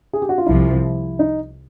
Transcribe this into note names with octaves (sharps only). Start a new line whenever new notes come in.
G#4
G4
F#4
F4
C2 C3 F3 E4
D#4